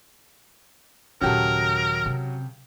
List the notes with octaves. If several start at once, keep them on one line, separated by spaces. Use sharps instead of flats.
D#2 A#2 C#3 F#3 F#4 G4 A4 A#4
C3